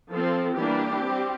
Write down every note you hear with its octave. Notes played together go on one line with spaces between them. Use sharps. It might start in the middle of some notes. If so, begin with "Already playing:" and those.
F3 C4 A4
E3 G3 A#3 D4 G4
G3 C4